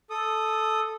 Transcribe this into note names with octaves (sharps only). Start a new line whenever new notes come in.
A4 D#6